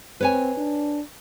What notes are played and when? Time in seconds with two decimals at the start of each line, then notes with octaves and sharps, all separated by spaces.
0.21 C4 B4 C#5 G#5
0.57 D4